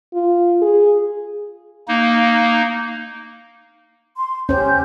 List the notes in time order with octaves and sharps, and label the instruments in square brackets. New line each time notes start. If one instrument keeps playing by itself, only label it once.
[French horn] F4
G#4
[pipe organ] A#3 D#4
[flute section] C6
[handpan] C#4 C5 [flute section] G4 G6